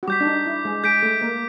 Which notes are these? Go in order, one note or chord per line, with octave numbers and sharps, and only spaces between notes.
F#4
G3 G4 D6 G6 B6
D4
D#4
E4
G#3 G#4
G#3 G#4 G6 B6 D7
A3 A4
A#3 A#4